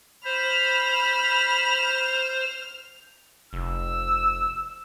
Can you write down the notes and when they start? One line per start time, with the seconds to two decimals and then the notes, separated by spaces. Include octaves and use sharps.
0.25 C5 B5 F6
3.53 F1 E6